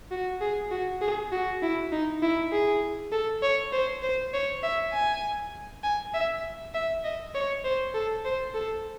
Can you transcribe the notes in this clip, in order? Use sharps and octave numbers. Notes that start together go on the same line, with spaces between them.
F#4
G#4
F#4
G#4
F#4
E4
D#4
E4
G#4
A4
C#5
C5
C5
C#5
E5
G#5
G#5
E5
E5
D#5
C#5
C5
A4
C5
A4